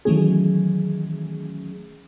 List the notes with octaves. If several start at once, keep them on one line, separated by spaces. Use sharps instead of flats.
D#3 E3 F#3 A3 C#4 G#4